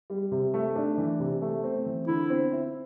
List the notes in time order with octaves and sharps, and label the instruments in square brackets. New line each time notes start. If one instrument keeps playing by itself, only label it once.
[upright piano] G3
C3
A3
D4
E3
C3
A3
C4
E3
[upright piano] D3 [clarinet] E4
[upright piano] C4
E4